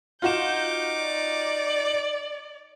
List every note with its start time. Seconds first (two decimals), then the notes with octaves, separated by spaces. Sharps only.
0.22 D#4 F4 F#4 D6 G6 E7
0.99 D5